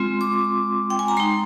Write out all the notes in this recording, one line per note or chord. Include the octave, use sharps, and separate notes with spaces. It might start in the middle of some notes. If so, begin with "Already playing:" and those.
Already playing: G#3 C4 F4 C6
D6
G5
G#5
A#5
G#3 D#4 C6